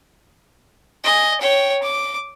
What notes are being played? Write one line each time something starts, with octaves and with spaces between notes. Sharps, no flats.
D#5 G#5
C#5 G5
D6